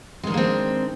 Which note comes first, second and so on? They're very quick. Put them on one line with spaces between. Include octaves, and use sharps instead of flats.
G#3 D#3 D4 A#3 C4